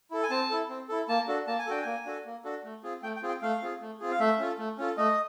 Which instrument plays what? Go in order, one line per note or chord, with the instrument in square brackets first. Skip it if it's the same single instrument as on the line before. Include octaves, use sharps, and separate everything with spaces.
[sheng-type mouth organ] E4 A4
G#5
C4 A5
E4 A4
C4
E4 A4
A#3 A5
D4 F#4 A4
A#3 A5
G#5
D4 F#4 A4 G5
A#3 G#5
D4 F#4 A4
A#3
D4 F#4 A4
A3
C4 F4 G#4
A3 G5
G5
C4 F4 G#4
G5
A3 F5
C4 F4 G#4
A3
C4 F4 G#4
F5
A3 E5
C#4 F4 A4
A3
C#4 F4 A4
A3 D#5